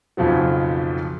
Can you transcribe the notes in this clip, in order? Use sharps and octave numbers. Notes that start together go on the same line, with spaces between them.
B1 F2 C#3 F3 F#3